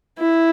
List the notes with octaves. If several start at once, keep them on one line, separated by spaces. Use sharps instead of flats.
E4